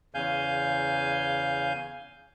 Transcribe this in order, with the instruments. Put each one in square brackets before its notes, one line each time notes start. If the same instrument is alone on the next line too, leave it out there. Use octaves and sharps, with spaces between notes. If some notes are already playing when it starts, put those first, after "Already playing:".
[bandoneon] E2 C#3 F5 G#5 G6